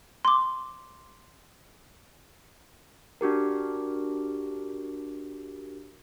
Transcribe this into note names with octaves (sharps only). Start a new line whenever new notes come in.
C6 D6
D4 F#4 G4 A#4